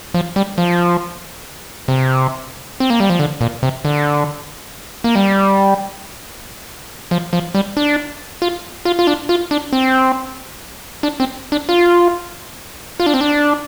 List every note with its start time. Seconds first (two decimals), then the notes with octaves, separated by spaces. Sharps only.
0.14 F3
0.36 G3
0.58 F3
1.88 C3
2.80 C4
2.90 A#3
3.00 G3
3.10 F3
3.19 D3
3.41 A#2
3.63 C3
3.85 D3
5.04 A#3
5.15 G3
7.11 F3
7.33 F3
7.55 G3
7.77 D4
8.42 F4
8.85 F4
8.99 F4
9.07 D4
9.29 F4
9.51 D4
9.73 C4
11.03 D4
11.20 C4
11.52 D4
11.69 F4
13.00 F4
13.06 D4
13.14 C4
13.21 D4